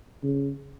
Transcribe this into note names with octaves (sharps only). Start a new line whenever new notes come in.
C#3